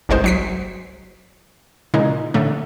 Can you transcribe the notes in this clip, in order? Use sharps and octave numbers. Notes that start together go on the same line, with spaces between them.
G1 C2 G#3 C5
F#3 B6 C7
A#2 C#3 G#3 D#4
A2 D3 A3